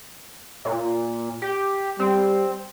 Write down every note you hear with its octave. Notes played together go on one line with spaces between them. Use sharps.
A#2
G4
G3 C4